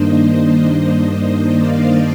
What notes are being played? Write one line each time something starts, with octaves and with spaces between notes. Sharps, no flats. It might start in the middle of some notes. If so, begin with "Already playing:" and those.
Already playing: G2 D#3 A#3 D4 C5 D#5
C5 D#5
D5 F5